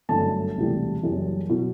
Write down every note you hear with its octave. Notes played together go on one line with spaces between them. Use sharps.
G1 F#2 D3 A3 A5
E1 D2 C3 G3
F#1 F#2 E3 G3
B2 F#3